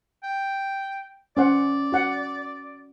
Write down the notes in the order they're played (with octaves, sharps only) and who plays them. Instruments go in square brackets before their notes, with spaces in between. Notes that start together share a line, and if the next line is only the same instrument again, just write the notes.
[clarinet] G5
[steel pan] C#4 C5 F#5 [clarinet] D5
[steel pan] F#4 F#5